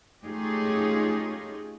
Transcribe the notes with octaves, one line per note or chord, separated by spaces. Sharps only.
A3 C#4 D#4 F4 G4 G#4